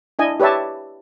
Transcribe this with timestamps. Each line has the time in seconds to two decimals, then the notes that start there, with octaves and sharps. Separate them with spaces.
0.19 D4 E4 D#5 G#5
0.40 G4 B4 C#5 D5 E5 A5